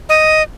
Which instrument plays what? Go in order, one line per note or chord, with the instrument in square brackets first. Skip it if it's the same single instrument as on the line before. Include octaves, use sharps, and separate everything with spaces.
[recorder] D#5